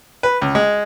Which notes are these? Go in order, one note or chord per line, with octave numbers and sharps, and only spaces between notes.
B4
C#2
G#3